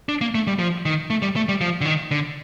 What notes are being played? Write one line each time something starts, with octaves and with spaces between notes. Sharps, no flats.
D4
A#3
A3
G3
F3
D#3
A3
G3
A3
G3
F3
D3
D#3
D3